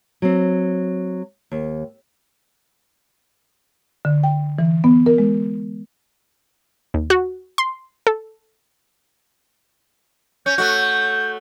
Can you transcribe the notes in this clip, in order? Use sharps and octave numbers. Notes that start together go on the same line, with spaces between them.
F#3 C4
D#2
D3
G5
E3
B3
A#4
G#3
D#2
F#4
C6
A4
C#4 G6
A3 F#4